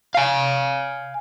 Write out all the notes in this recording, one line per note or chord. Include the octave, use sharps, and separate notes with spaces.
F5 G#5